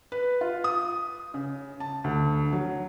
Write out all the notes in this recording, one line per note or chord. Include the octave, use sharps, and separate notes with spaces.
B4
F4
D#6
C#3
A5
D2
F#3